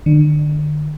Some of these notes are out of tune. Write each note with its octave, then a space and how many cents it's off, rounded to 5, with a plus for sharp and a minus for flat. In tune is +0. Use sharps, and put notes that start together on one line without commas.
D3 +35